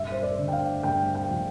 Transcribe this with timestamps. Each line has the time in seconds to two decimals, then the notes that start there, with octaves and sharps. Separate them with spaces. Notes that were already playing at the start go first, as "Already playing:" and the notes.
Already playing: G2 E5
0.12 C5
0.23 D5
0.38 D3
0.48 G5
0.53 F5
0.83 G2 G5
1.15 G5
1.30 F3